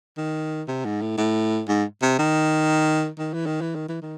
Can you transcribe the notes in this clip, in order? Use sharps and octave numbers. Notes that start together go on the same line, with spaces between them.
D#3
C3
G#2
A2
A2
G#2
C3
D#3
D#3
E3
D#3
E3
D#3
E3
D#3